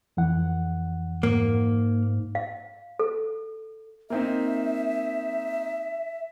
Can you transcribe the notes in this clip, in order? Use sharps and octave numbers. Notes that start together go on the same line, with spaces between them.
F2 E3 F#5
G#2 A#3
F5
A4
A#3 C4 D#4 E5